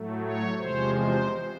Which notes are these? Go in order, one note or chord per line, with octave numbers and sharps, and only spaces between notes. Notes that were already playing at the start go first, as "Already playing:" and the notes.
Already playing: A2 F#3 A3
C#5
E2 C3 F3 G#3 C5
C5